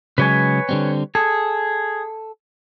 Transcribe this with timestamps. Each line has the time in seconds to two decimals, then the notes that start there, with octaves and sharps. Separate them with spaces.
0.18 C#3 F#3 G#3 B4 C#5 G#5
0.69 D3 G3 C4
1.15 G#4 A4